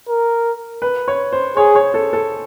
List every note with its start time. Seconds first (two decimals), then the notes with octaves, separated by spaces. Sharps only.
0.09 A#4
0.82 B4
1.08 C#5
1.32 C5
1.57 G#4 C#5
1.75 C#5
1.94 A4
2.13 A4